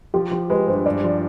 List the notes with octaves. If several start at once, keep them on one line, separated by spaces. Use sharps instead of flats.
F3 G4
F3
G#3 B4
G2 C5
G2 D5
F3